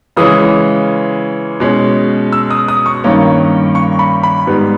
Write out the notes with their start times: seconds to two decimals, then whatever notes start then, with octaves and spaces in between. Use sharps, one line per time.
0.16 C#3 E3 G#3 C#4 D#6
1.60 B2 G#3 C#4
2.32 E6
2.50 D#6
2.68 D#6
2.86 C#6
3.04 G2 D#3 A#3 C#4
3.75 C#6
3.99 B5
4.23 B5
4.47 G#2 G3 B3